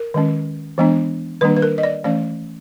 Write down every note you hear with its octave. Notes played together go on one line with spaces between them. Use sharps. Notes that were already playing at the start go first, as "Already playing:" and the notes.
Already playing: A#4
D#3 G#3 C#4
E3 G#3 B3 D4
D#3 G3 A#3 D4 B4
B4
A#4
D#5
D5
E3 A3 C#4 D5